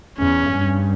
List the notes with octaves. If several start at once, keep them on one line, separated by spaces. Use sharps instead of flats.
E2 C#4
G2